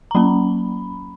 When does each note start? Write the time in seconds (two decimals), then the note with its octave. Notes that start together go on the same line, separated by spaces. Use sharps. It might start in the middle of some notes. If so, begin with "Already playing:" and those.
0.11 A#5
0.15 F#3 A#3 C#4 B5